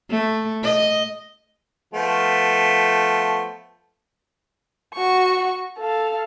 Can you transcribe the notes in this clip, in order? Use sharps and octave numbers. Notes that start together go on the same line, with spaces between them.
A3
D#5
F3 A3 B3
F#4 C#6
A4 F5